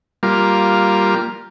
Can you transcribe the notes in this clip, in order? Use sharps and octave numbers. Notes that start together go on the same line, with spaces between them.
G3 A#3 F4